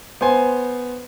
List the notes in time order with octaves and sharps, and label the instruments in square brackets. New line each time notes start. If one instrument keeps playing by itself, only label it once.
[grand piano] B3 C5 G#5